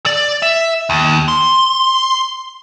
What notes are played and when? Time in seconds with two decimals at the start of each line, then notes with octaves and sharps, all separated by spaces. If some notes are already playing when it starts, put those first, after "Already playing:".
0.06 D5
0.43 E5
0.90 D#2
1.28 C6